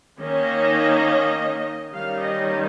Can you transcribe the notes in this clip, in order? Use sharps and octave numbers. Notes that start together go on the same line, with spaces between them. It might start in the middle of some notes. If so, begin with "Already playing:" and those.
D#3 A#3 C#4 D#5
D#3 G3 A#3 C#4 F5
D#5